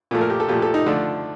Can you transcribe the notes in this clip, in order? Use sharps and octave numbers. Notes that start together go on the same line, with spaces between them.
A#2 F3 A3
A#4
G4
A4
A#2 F3 A3 G4
A4
D#4
D3 F3 A3 D4